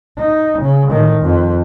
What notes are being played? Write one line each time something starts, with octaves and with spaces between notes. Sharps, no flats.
D#4
C#3
A2 D#3
F2